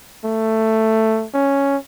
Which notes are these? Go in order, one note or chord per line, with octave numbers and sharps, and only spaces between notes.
A3
C#4